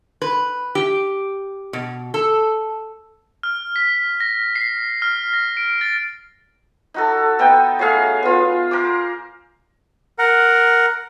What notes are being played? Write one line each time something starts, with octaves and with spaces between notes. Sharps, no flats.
B4
G4
B2
A4
F6
B6
A#6
C7
F6
A#6
D7
A6
D#4 F#4 A4
B3 D#4 B4 G5
F#3 A3 G#4 F5
B3 F4
A#4 C5 D6
A#4 F#5